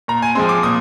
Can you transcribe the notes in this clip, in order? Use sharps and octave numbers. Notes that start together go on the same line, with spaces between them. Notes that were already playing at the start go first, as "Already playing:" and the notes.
A#2 A#5
G#5
F3 G#3 C4 C6
D6
A#2 D#6